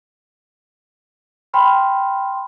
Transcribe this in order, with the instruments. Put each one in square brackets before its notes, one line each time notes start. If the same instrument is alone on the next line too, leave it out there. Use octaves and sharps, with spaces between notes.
[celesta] G5 B5 C6 F6